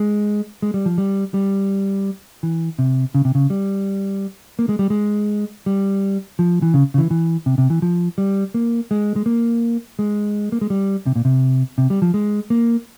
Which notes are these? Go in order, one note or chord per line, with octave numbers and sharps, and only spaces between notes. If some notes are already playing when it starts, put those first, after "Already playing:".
Already playing: G#3
G#3
G3
F3
G3
G3
E3
C3
C#3
C3
C#3
G3
A#3
G#3
G3
G#3
G3
F3
E3
C#3
C#3
E3
E3
C3
C3
E3
F3
G3
A#3
G#3
G#3
A#3
G#3
A#3
G#3
G3
C3
A#2
C3
C3
G3
F3
G#3
A#3